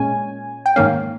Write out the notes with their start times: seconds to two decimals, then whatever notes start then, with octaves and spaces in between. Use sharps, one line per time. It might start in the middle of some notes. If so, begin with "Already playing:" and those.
Already playing: A#2 G#3 C#4 G#5
0.66 G5
0.76 G#2 D#3 A#3 C#4 F5